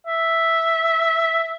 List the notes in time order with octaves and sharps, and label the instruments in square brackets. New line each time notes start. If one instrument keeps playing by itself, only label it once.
[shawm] E5